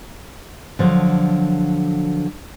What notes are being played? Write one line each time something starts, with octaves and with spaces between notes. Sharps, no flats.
D3 F3 F#3